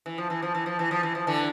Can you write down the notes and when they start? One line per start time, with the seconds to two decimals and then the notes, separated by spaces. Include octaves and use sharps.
0.06 E3
0.18 F3
0.30 E3
0.42 F3
0.55 E3
0.66 F3
0.79 E3
0.91 F3
1.03 E3
1.15 F3
1.27 D3 E3